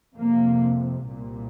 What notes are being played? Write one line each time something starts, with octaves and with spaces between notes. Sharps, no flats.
F2 C3 A#3
C2 A#2